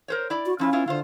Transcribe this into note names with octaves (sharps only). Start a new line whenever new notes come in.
A#4 C5 C#5
E4 D5
F#4
F3 C#4 E4 F4
B3 E4 F4
D3 F4 C5